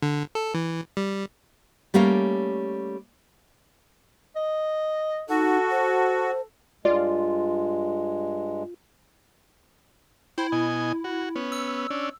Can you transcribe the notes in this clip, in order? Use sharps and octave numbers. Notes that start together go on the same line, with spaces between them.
D3
A4
E3
G3
G3 A3 A#3 C#4 A#4
D#5
D#4 F#4 A4
C5
G2 G#3 F4 D5
E4 C5 G5
B2 D#5 G#5
F#4
B3 C#4
E6
C#4 D4